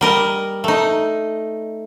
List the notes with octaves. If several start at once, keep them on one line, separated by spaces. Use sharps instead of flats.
G3 A#4 D#5
A3 D#4